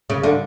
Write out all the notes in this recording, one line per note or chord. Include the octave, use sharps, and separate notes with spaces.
C#3
D3